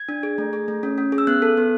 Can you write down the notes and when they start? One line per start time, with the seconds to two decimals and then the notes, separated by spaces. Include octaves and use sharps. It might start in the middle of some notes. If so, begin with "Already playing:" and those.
Already playing: G#6
0.09 D4
0.23 G#4
0.38 A3
0.53 G#4
0.68 A3
0.83 C#4
0.98 C#4
1.12 G#4
1.18 E6
1.27 B3 F#6
1.42 A4
1.57 B3